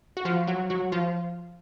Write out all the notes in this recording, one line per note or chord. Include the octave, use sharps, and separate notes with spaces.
F#4
F3 F4
F#3 F#4
F#3 F#4
F3 F4